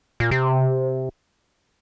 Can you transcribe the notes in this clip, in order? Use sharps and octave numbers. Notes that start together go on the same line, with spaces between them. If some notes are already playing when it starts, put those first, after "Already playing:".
A#2
C3